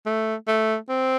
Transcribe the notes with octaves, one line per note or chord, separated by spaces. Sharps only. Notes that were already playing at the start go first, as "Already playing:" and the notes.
A3
A3
C4